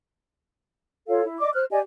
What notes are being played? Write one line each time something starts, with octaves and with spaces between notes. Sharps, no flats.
F4 A4 C#5 F5
E4
D5 D#5 D6
C5 F6 F#6
G4 D5 D#5 G#5